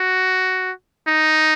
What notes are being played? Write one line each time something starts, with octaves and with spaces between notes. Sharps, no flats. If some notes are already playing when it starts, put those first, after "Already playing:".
Already playing: F#4
D#4